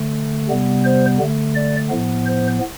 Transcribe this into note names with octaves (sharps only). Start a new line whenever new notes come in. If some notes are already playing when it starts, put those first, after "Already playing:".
Already playing: D3 A3
C3 G3 B3
C5
D3 A3
D5
A2 F3 B3
C5